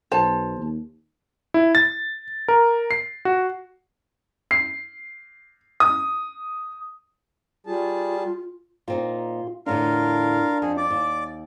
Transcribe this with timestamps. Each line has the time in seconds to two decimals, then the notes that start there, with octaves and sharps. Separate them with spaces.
0.11 B1 C5 A5
0.58 D#2
1.54 E4
1.75 A6
2.48 A#4
2.91 C7
3.25 F#4
4.51 C7
5.80 D#6
7.67 G3 F4 G#4 A5
8.88 A#2 C4 D#4 F4
9.66 E2 A2 D3 D4 F4 A#4 F5
10.62 F2 G#4
10.77 D5 D6
10.90 D#2